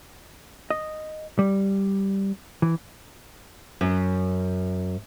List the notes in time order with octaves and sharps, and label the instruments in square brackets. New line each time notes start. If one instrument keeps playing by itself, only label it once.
[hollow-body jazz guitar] D#5
G3
E3
[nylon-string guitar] F#2